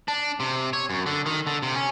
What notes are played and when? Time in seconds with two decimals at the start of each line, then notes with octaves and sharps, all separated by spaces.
0.08 D4
0.40 C3
0.73 C#5
0.90 F#2
1.06 D3
1.26 D#3
1.47 D3
1.63 C3
1.75 C#4